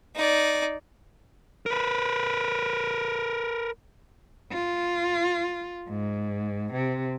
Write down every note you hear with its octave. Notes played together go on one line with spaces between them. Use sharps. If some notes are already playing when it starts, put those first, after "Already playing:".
D#4 D5
A#4 B4
F4
G#2
C3